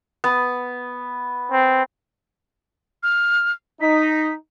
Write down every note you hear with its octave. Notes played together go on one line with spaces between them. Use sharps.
B3
C4
F6
D#4 B6